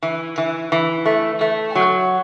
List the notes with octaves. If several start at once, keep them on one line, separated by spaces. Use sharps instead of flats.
E3
E3
E3
A3
A3
F#3